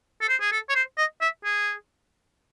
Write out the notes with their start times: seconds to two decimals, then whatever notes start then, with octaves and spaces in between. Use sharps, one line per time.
0.21 A4
0.29 C5
0.41 G#4
0.52 A4
0.69 C#5
0.75 C5
0.98 D#5
1.21 E5
1.45 G#4